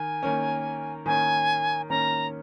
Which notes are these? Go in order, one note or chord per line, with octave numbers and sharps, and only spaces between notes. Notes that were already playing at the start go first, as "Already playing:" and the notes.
Already playing: D#3 G#5
D#3 A#3 C#4
D#3 A#3 C#4 G#5
D#3 A#3 C#4 A#5